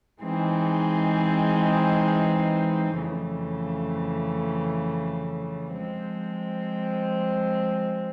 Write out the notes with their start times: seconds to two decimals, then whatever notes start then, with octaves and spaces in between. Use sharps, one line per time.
0.21 E3 G#3 C4 D#4 G#4
2.97 F2 C#3 E3 A3
5.72 F3 G#3 C4